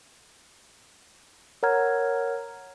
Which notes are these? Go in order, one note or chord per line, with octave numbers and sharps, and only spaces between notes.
A#4 C#5 F#5 A#5 F6 G#6